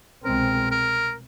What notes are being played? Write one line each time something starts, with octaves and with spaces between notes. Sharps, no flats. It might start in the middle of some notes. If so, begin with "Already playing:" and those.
C2 B2 G#3 C4 A#4
A#4